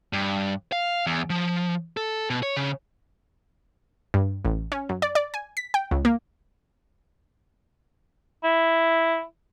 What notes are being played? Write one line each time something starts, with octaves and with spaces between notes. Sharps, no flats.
G2
F5
E2
F3
A4
B2
C#5
C#3
G2
A1
C#4
F#2
D5
D5
G#5
B6
G5
C#2
A#3
E4